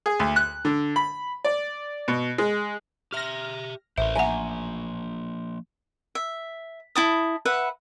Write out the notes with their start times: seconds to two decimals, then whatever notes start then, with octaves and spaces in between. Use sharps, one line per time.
0.06 G#4
0.19 D2
0.36 F#6
0.65 D3
0.96 B5
1.45 D5
2.08 B2
2.38 G#3
3.13 G4 E5 F6 A#6
3.98 A1 A#4 C5 E5
4.16 F3 A#3 E5 F#5 G#5 A#5
6.15 E5
6.95 E4 A5 D#6
7.45 B4 E5 F#5